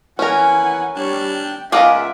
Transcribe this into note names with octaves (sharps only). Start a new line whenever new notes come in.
E3 C#4 A#4 F#5 G#5
G3 D4 C#5
G5
C#2 F4 G#4 A#4 D#5 E5 F#5 D6